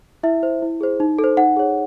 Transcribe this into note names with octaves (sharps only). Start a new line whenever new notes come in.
E4 E5
C5
E4
G#4 C5
D#4
A4
C5
D#4 F#5
G#4 C#5